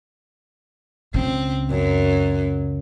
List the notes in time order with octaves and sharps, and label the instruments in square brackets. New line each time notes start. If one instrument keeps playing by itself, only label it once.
[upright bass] C#2 C#3 [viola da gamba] C4
[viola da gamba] F#2